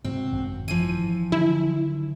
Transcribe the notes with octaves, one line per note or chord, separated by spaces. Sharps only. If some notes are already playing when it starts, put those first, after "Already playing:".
G#2 C3 C4 F#4
G#1 F#2
E3 F3 D#7
D3 D#3 F#3 E4